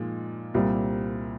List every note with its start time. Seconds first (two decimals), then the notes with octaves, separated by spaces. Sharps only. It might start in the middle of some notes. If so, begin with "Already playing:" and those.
Already playing: A#2 F3 G#3 D#4
0.54 C2 A#2 G3 C4